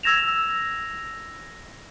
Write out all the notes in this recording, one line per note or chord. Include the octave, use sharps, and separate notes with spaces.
E6 G#6 A#6 E7 F7